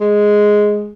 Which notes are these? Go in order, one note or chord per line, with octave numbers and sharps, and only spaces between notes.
G#3